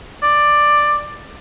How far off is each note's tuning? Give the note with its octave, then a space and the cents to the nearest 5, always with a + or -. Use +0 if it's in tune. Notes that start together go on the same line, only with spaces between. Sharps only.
D5 +10